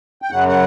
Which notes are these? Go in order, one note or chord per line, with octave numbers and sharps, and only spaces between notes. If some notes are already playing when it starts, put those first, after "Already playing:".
G5
F#2 C#3 F#3 F#5
F#5